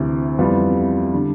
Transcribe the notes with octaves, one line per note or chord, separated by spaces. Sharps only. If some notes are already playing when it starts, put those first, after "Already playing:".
Already playing: D2 C3 E3
F2 E3 G3 B3 F4
D3 G3